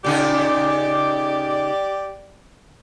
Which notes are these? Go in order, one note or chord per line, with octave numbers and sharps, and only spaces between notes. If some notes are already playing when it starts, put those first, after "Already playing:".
A#2 C#3 D#4 G4 D5